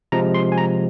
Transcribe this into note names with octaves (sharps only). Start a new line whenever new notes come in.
C3 F3 G#3 A#5
C6
G#5
A#5